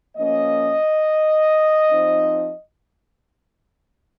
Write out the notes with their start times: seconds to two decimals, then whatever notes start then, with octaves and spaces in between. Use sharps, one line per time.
0.17 F3 A#3 C#4 D#5
1.90 F3 C4 D#4